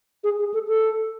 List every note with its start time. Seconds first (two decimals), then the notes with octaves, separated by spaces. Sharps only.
0.24 G#4
0.39 G#4
0.54 A4
0.68 A4